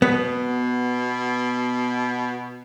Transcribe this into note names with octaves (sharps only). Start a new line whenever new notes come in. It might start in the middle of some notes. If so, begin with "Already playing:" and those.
B2 B3